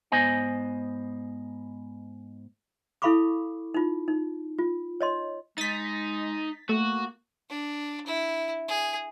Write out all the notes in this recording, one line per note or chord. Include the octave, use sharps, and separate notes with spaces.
G#2 B3 C5 D#5 G#5
E4 A4 F5 B5 C#6 D6
D#4 F4
D#4
F4
C#5 D#5 C6
G#3 D#4 A6 B6
A3 A#3 F#4
D4
E4
G#4